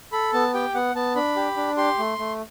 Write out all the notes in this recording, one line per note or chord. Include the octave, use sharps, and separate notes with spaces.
A4 B5
B3 A5
G4 G5
B3 F#5
B3 A5
D4 B5
G4
D4
G4 C6
A3
A3